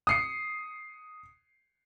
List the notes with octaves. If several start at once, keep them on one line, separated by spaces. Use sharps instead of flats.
D#6 C7 C#7